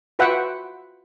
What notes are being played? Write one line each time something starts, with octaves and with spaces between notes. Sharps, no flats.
F4 F#4 B4 E5 F#5 G5